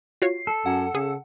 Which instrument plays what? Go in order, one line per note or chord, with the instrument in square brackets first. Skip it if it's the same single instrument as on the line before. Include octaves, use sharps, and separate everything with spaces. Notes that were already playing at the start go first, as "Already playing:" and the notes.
[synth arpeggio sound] F4 F#4 C#5 [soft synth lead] C7
[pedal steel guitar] A4
[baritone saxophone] F#2 [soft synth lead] F#5
[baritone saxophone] C#3 [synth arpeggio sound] G#4